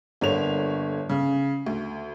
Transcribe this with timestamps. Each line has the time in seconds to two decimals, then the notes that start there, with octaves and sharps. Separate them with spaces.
0.21 G1 D3 A#3 C#5 F7
1.09 C#3
1.66 D2